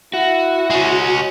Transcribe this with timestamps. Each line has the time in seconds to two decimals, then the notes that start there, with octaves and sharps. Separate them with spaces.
0.14 E4 F#4
0.70 G#3 C#4